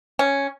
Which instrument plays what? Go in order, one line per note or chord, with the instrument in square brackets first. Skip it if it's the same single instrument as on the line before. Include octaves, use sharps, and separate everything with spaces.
[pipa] C#4